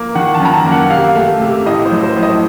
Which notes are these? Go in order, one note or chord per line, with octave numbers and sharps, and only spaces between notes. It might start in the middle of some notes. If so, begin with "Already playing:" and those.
Already playing: A#3
D#3 F#5
A5
F#2 A#5
A5
A#3
F#5
C3 F5
A3
C3
A2 D#5
C5
F#3
C5
A2
D#5